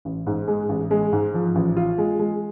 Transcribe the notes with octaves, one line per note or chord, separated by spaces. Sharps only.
A1
G#2
G#3
A1
G#3
G#2
F3
A1
F4
G#3
G#3